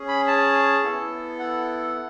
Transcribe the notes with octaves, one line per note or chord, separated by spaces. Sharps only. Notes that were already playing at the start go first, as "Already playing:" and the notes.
Already playing: C#4 G#4
B5
A5
B3 E4 A4
F#5